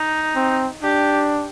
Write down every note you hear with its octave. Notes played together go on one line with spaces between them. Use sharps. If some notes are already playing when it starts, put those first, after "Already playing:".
Already playing: D#4
C4
D4 G4